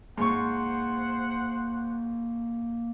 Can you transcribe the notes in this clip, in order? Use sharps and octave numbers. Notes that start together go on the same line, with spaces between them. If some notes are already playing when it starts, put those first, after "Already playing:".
G#2 A#3 C5 F#5 C#6